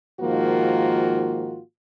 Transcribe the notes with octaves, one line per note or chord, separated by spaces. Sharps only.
G#2 D#3 F3 A#3 F4 F#4